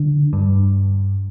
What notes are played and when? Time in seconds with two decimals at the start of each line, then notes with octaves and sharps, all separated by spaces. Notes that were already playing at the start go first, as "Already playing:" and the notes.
Already playing: D3
0.33 G2